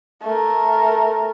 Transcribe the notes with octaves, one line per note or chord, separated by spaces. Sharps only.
A3 A#4